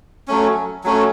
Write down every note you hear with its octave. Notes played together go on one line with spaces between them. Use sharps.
F#3 A3 C#4
F#3 A3 C#4